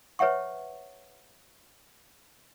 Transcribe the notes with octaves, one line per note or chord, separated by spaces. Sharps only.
B4 C#5 E5 F#5 C#6